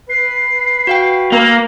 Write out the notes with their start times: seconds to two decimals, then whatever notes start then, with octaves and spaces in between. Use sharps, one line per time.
0.09 B4 C7
0.87 F#4 F5 G5
1.32 A#3 E6